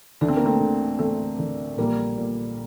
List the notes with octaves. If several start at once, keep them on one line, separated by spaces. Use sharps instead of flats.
D2 D4
C4
A#3
A3 C4
D3
D2 A3 C4
D3
A#1 G3 A#3
A#2